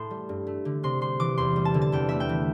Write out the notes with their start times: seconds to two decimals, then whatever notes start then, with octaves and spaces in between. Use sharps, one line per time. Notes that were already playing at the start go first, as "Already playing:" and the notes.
Already playing: A2 A5 C6
0.11 G3
0.29 G2
0.47 A3
0.65 D3
0.83 C3 C6
1.01 G3 C6
1.20 E3 D6
1.37 E2 C6
1.56 G3
1.65 A5
1.74 D3
1.82 A5
1.92 E2 G5
2.09 A3 E5
2.20 G5
2.29 E3